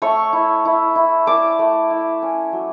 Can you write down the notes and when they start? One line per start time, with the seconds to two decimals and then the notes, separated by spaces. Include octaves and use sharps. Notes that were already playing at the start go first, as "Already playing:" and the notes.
0.02 A3 C#5 C#6
0.33 E4
0.65 E4
0.95 E4
1.27 E4 D5 D6
1.59 A3
1.90 E4
2.22 C#4
2.53 F#3